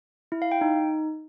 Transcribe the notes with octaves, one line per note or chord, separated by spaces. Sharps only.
E4
F5
G5
D#4